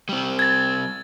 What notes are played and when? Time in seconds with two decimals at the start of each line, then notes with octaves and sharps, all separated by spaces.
0.09 G3 C4
0.39 G#6 A6